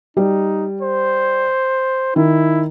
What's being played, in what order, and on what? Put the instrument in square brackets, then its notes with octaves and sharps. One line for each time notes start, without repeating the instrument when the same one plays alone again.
[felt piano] G3 [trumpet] D#4
[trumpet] C5
[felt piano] D#3 [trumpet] E4